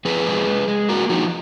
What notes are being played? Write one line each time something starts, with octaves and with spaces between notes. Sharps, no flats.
F2 G#4 B4
G#3
G#3
G#3
A#3 F#4 A#4
F3 D#4 F#4